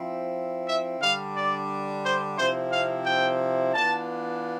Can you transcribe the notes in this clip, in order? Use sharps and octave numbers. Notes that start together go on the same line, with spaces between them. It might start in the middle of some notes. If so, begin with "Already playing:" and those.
Already playing: F3 C4 E4
E5
D3 G3 D4 F5
D5
C5
C3 F3 C4 E4 C5
F5
G5
E3 B3 D4 F4 A5